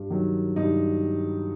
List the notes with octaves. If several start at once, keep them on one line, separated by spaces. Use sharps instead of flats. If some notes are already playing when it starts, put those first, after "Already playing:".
Already playing: G2
D#3 F#3
G2 D#4